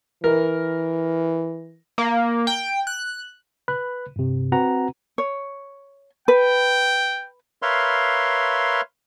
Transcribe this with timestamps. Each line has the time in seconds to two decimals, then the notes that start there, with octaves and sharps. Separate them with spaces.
0.24 E3 A#4
1.98 A#3
2.47 G5
2.87 F#6
3.68 B4 B5 F#6
4.16 G2 C3
4.52 C4 F#4 B4 F#5 A#5
5.18 C#5
6.28 B4 G5
7.62 A#4 B4 C#5 E5 F5 C6